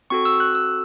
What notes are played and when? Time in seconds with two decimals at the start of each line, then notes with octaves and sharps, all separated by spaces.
0.10 C4 F#4 A4 C#6
0.25 E6
0.40 F#6
0.55 E6